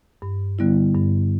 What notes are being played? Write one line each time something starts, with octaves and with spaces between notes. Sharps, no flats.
G2
D3 G3 B3 E4
G2